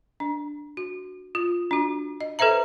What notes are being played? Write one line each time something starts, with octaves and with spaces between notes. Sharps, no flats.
D4
F#4
F4
D4 F#4
D#5
A4 B4 C5 E5 A#5